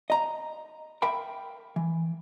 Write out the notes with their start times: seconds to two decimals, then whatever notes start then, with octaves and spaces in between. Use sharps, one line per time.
0.10 D#5 A#5
1.02 A#4 E5 G5 B5
1.76 E3